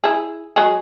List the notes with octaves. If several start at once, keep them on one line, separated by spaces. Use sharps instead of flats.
E4 G#4
F#3 G#3 G#4